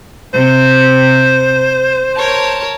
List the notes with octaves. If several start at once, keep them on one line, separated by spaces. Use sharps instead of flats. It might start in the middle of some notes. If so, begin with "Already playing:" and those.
C3 C5
A#4 C#5 A5